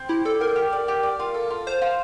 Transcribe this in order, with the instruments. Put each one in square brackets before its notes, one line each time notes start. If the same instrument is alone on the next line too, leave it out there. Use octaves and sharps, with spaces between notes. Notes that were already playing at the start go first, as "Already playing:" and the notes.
Already playing: [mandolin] C4
[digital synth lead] E4 [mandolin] G4
[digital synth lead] A4 [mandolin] D5
[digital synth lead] A#4 [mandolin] G5
[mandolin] G4
D5
G4
D5
F4
A4
F4
[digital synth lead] C5 [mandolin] F5
[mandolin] F4